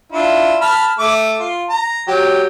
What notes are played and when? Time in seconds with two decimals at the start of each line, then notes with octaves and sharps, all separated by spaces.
0.12 D4 E4 F4
0.61 A5 B5 F6
0.99 A3 D6
1.40 F4
1.69 A#5
2.08 F#3 G4